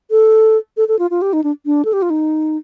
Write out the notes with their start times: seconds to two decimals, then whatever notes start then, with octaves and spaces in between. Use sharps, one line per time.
0.11 A4
0.77 A4
0.88 A4
0.99 F4
1.10 F4
1.22 G4
1.33 D#4
1.44 D4
1.66 D4
1.85 A4
1.93 G4
2.02 F4
2.10 D#4